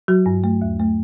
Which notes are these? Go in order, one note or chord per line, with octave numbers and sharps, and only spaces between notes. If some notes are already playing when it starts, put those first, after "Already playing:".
F#3 F#4
G2
A3
D#2
A3